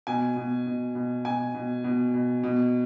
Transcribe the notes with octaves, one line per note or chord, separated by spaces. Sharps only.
B2 G#5
B2
B2
B2
B2 G#5
B2
B2
B2
B2